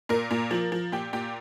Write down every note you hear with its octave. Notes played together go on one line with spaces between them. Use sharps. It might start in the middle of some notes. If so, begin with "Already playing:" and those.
A#2 A#4
A#2
F3
F3
A#2 G4
A#2 G4